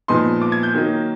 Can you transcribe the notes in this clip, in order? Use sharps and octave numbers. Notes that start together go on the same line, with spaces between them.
A#2 F3 G#3 B3 D#4 C6
D6
G#6
G6
D#3 F#3 A#3 D#4